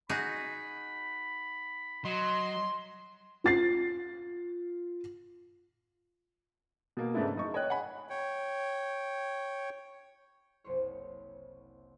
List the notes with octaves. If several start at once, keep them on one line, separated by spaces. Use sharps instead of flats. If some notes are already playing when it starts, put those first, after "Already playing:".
D#4 F#4 G#4 B5
F#3 D#5 C6
F4 A6 C7
B2 A#3
G#2 C#3 A3 B3 D4 E4
F#1 D#4 C#6
C#5 D#5 G5 F#6
F#5 G#5 B5
C#5 G5
F#1 C2 C5 C#5